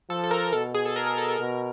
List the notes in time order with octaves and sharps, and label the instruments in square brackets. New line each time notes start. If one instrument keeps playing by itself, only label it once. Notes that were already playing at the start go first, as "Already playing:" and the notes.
[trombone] F3 [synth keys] A4
[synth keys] A4
A#4
[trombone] B2 [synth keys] A4
[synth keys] G#4
A4
A#4
A#4
A4
A#4
[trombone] B2